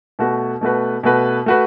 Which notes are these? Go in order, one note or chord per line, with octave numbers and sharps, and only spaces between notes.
B2 A3 F#4 B4
B2 A3 F#4 B4
B2 A3 F#4 B4
A3 F#4 B4